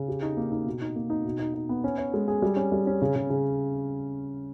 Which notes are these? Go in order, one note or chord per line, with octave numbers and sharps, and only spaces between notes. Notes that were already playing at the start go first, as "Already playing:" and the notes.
Already playing: C#3
G4
D#4
A#3
D#4
B2
D#4
A#3
D#4
B2
D#4
D#4
B3
C#4
C#5
G#3
G#4
G3
C#4
G3
C#4
C#3
C#3
C#3